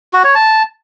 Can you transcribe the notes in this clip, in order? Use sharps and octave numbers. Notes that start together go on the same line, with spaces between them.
F#4
C#5
A5